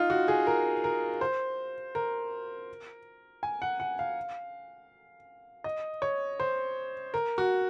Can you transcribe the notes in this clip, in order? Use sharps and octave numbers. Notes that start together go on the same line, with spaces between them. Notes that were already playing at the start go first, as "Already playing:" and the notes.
Already playing: D#4 F4
F#4
G#4
A#4
A#4
C5
A#4
G#5
F#5
F#5
F5
D#5
C#5
C5
A#4
F#4